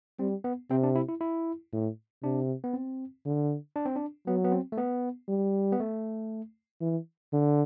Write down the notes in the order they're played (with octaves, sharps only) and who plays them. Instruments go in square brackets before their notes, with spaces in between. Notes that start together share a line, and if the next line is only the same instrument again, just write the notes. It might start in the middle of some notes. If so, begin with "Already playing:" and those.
[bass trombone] G3 [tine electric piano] C4
[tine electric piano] B3
[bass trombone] C3 [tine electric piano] C4
[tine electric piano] D4
E4
E4
E4
[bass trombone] A2
[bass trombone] C3 [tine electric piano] D4
[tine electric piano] B3
C4
[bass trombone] D3
[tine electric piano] D4
C4
D4
[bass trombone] F#3 [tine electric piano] B3
[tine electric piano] B3
C4
A3
B3
[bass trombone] G3
[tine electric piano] B3
A3
[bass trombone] E3
D3